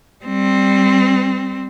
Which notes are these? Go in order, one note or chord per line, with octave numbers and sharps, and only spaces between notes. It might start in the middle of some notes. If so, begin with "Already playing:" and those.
G3 C4